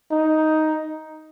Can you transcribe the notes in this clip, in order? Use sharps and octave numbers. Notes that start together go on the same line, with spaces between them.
D#4